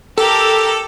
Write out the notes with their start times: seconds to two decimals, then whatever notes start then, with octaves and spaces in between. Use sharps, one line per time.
0.18 G4 A4 A#4